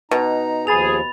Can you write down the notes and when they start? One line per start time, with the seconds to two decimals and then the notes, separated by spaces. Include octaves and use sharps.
0.11 B2 D#4 A#5
0.67 D#2 F3 G#4 B5 A6 F7